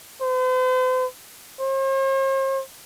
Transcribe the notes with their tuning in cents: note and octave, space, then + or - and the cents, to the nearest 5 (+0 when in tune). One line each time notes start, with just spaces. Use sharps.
C5 -45
C5 +45